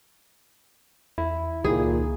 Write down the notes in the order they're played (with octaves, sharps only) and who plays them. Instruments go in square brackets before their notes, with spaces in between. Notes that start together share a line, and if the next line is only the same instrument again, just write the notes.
[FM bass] E2 [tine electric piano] E4
[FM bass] C#2 [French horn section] A#2 [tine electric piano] D#3 [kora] G#4